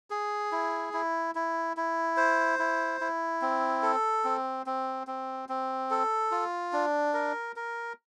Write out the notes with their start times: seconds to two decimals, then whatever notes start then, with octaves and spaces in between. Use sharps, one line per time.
0.10 G#4
0.52 E4
0.93 E4
1.35 E4
1.77 E4
2.17 C5
2.59 E4
3.01 E4
3.42 C4
3.83 A4
4.24 C4
4.66 C4
5.07 C4
5.49 C4
5.90 A4
6.31 F4
6.73 D4
7.14 A#4
7.56 A#4